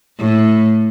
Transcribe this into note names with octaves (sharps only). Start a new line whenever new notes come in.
A2